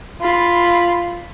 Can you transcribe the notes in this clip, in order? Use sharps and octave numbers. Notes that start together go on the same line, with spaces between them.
F4 B5